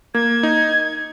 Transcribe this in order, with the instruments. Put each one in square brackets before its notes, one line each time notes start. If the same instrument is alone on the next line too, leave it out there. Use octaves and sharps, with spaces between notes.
[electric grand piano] A#3 [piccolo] G#6
[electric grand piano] D#4